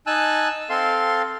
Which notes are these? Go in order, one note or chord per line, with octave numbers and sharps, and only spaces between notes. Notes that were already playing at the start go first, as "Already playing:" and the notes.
D#4 G#5 A5 E6 F#6
C4 A4 F5 C6